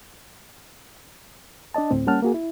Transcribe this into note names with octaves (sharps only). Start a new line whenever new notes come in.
D4 D5 D#5 A5
D2 A2 C4
G3 A#3 C#4 F#5 A5 F6
A#3 F#4 G#4
E4